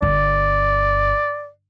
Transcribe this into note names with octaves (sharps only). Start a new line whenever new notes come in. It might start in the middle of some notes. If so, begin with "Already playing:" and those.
G1 D5